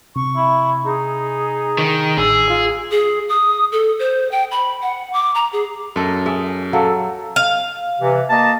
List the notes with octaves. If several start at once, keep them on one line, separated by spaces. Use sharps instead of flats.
C3 C#6
E4
D#4 G#4
D#3
A1 G#4 E6
F4
G#4
D#6
A4
C5
G5
B5
F#5
D6
A#5
G#4
F#2 A4 D#5
G#4 E5 G#5 D#6
F#3 G#4 A4 F5
F5
C3 E3
A#3 D#5 A5